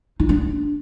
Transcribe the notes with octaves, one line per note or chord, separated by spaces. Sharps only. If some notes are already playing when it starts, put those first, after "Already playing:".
D#4
D4